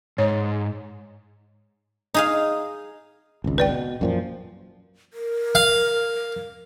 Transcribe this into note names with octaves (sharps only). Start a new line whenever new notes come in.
G#2 C#5
D#4 G#4 F5
G#1 C#2
B4 D5 G5
B2
F#2 A#2 F3
A#4
F5